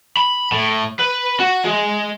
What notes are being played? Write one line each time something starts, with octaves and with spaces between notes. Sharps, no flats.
B5
A2
B4
F#4
G#3